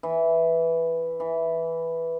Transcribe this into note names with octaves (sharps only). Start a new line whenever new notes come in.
E3
E3